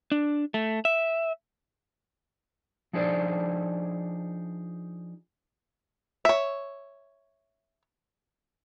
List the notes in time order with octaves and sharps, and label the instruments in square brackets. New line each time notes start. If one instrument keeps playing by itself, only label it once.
[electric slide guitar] D4
A3
E5
[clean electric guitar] F3 D4 D#4 G#4 C5 D5
[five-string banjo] C#5 E5